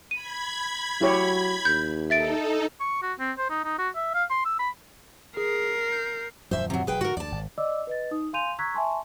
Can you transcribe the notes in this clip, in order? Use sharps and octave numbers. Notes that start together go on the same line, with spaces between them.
B5 G#6 D#7
F#3 E4 G4 C#5
D#2 G6
D#4 A4 E5 A6 D7
C#6
F#4
C4
C5
D#4
D#4
F#4
E5
F5
C6
E6
B5
G#4 A#4 C7
G6
D#1 F#2 F3 C5 E5
C3 F#3
E1 F#3 G#4 B4 G5
G#2 B2 D3 F#4 A#4
D2 D5 A5
G#1
D5 D#5 D6 E6
B4 D#5 A6
D#4 D#6
F5 G#5 C6 G6 D#7 F7
A#5 C#6 E6 F#6 G#6 B6
E5 G#5 A5 C6 C#6